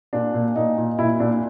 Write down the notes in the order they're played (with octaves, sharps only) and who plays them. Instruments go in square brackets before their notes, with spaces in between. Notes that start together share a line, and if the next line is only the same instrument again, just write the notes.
[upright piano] A#2 D4
A#2
A#2 D#4
A#2
A#2 E4
A#2 D4